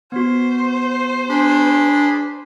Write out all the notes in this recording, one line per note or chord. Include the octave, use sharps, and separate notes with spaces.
B3 F#4 C5
D4 G#4 B5 C6